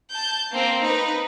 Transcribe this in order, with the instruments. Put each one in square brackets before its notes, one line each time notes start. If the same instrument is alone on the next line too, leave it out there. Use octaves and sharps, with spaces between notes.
[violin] A5 G6
A#3 C4
D#4 B4